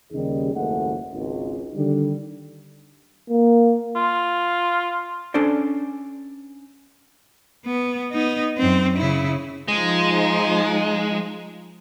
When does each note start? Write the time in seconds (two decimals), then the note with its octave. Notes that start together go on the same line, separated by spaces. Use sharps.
0.12 D#2 C#3 G3 D#4 G#4
0.54 F#1 D#2 G#2 A3 F#5
1.12 G#1 C#2
1.75 D3 D#3 G3
3.30 A#3
3.96 F4
5.34 C#4 D4 A4 C5 D5
7.66 B3
8.12 B3 D#4
8.58 F#2 C4
8.98 C#3 E4
9.68 F3 G#3 D#4